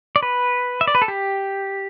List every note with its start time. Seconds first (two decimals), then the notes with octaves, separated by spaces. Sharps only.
0.16 D5
0.23 B4
0.81 E5
0.88 D5
0.95 B4
1.02 A4
1.08 G4